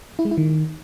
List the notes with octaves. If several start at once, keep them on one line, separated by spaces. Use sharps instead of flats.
E4
G#3
E4
D#3